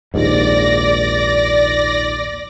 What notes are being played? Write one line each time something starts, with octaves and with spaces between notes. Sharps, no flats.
A#1 D#2 G#2 D5 A#6